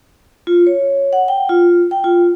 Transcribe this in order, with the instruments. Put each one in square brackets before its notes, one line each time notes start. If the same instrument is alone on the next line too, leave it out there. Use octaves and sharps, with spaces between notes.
[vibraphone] F4
C#5
F#5
G5
F4
G5
F4